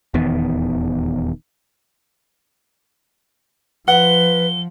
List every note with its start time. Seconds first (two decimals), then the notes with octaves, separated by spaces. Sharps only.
0.14 D#1 E2 D#3 B3
3.88 F3 B4 F#5 G7